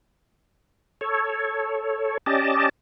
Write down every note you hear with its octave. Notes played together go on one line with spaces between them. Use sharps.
A4 C#5
C#4 G4 D5 D#5 A5